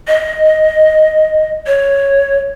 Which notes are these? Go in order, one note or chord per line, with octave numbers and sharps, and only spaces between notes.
D#5
C#5